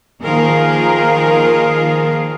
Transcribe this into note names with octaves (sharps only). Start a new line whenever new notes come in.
D#3 F3 A#3 F4 G#4 A#4